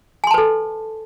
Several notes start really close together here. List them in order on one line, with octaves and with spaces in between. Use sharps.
G#5 C6 A5 B4 A4